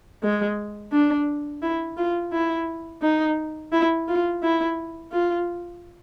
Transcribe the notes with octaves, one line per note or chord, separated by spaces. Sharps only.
G#3
D4
E4
F4
E4
D#4
E4
F4
E4
F4